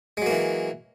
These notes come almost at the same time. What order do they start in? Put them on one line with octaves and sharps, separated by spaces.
G#3 F#3 A#3 E3